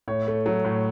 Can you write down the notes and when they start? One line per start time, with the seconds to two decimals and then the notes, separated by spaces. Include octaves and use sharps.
0.08 A2 C#5
0.28 A3
0.46 F#3
0.65 A2